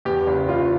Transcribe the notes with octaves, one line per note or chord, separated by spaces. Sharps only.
E2 G4
F#1
F#1 F4